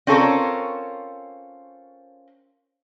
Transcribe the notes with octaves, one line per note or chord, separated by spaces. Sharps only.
C4 C#4 F4 A4 A#4 C#5